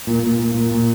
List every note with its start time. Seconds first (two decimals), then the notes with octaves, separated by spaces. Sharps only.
0.07 A#2
0.23 A#2
0.39 A#2
0.55 A#2
0.71 A#2